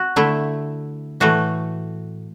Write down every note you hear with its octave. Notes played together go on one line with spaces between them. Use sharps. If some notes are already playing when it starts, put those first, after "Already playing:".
Already playing: F#4
D3 A3 E4
A2 E3 A3 F#4